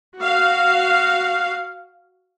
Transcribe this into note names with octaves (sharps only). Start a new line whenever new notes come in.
F#4 F5